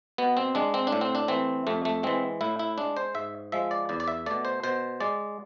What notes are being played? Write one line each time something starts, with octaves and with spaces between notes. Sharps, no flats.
B2 B3
C4
G#3 D4
C4
D4
A2
C4
D4
E3 A3 C4
F2 A3
A3
E3 G#3 C4
A2 E4
E4
G#3 D4
C5
G#2 E5
F3 G#3 E5
D5
E2 D5
D5
E5
B2 A3 D5
C5
B2 C5
G#3 D5